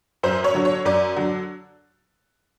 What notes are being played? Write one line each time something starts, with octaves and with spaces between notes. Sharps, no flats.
F#2 C5
C#5
D3 F#3
C#5
F#2 D5
D3 F#3